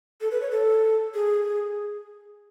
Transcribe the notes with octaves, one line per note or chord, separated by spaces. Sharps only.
A4
B4
C#5
A4
G#4